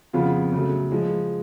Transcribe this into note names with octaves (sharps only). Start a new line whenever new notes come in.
F2 C#3 F3 B3 F4
C#3 F#3 A3
F3 G#3